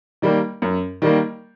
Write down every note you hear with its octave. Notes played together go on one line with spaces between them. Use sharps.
D#3 G3 A#3
F#2
D#3 G3 A#3